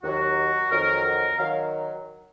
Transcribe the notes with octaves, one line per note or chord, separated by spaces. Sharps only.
D#2 D#3 F#3 F#4
F2 D#3 F#3 A#4
A#4
D#3 F#3 F5